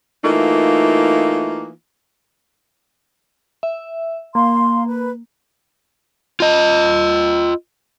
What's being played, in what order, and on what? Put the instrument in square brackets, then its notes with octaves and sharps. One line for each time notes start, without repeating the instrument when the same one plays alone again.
[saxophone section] E3 A3 A#3 D#4 F4
[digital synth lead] E5
[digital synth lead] A#3 [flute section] F5 C6
[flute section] B4
[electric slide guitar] F4 D#5